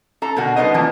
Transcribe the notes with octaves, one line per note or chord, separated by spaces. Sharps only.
A4 A#5
B2 D3 F#4 A#4 F#5
G3 B3 D#4 B4 C5 D#5
E3 F3 A#3 D5